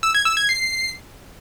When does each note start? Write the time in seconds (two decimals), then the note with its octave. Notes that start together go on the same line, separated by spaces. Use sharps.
0.03 E6
0.15 G#6
0.26 E6
0.37 G#6
0.49 C7